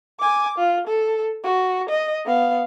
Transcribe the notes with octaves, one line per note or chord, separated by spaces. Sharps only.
G#5 D6
F4
A4
F#4
D#5
B3 F5